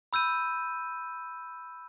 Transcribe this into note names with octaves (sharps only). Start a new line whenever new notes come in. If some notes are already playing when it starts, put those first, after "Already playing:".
B5 E6 G6 D#7